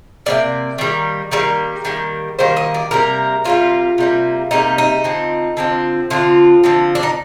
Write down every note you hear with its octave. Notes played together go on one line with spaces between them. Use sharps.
C3 G3 A#3 D5
D#3 G3 A#3
D#3 G3 A#3 A#4
D#3 G3 A#3
D#3 G3 A#3 C5
D#5
D5
C3 G3 A#3 A#4
C3 G3 A#3 F4
C3 G3 A#3
C3 G3 A#3 D#4
D#4
D3 F3 C4
D3 F3 C4
D3 F3 C4 F4
D3 F3 C4
D4
D#4